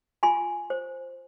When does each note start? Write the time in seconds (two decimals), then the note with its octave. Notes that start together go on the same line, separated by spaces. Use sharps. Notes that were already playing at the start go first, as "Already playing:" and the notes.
0.23 F4 G#5 C6
0.70 C5